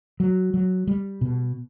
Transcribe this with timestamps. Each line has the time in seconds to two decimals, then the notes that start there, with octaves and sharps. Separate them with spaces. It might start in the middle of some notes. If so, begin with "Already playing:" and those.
0.20 F#3
0.54 F#3
0.87 G3
1.21 B2